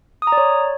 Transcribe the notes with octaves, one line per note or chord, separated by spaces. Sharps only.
D#6
A#5
D5
C#5